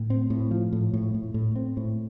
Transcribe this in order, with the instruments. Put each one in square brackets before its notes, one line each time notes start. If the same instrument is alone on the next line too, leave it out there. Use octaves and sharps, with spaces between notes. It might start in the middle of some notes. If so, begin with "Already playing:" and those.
Already playing: [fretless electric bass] A2
C4
A2
F3
A2
A2
A2
A2
C4
A2